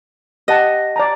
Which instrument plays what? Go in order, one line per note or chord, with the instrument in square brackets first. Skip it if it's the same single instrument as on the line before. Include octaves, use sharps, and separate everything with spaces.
[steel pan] G4 F#5 A5 [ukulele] D#5
[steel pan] D5 A5 A#5